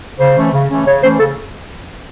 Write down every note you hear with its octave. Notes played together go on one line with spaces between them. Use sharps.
C#3 C5
E3 A3 C#4
C#3
E3 A3 C#4
C#3 C#5
E3 A3 C#4 C5
C#3 A4